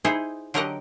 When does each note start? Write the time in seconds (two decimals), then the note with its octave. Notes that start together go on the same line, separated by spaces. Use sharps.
0.05 D#4 E4 G#4 C5
0.54 D3 F#3 G4 A#4 D#5 F#5